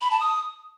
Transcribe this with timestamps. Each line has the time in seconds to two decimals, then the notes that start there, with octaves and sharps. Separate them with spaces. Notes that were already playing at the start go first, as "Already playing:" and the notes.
0.01 B5
0.11 A5
0.20 D#6